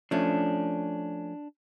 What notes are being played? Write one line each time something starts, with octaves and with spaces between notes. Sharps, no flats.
F3 A3 C#4 D4